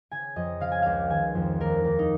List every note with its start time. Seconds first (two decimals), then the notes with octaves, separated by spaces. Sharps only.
0.11 C#3 G#5
0.36 F2 D#5
0.60 C#3 F5
0.72 G#5
0.82 C#2 F5
1.10 D#3 G#5
1.35 F2
1.60 D#2 A#4
1.84 D#2
1.99 D#4